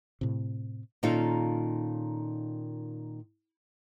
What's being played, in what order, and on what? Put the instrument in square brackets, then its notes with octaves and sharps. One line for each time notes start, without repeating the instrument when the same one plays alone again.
[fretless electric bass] A2 C3
[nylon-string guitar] A#2 D#3 C#4 D#4 F4 A4